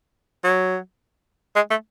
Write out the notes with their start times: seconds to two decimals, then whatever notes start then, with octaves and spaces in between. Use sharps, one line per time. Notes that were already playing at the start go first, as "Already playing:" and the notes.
0.44 F#3
1.56 G#3
1.70 A3